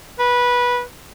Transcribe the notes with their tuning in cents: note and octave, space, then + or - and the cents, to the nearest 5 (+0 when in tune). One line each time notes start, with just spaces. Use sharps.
B4 -15